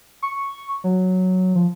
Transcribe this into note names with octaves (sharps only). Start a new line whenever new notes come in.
C#6
F#3
F3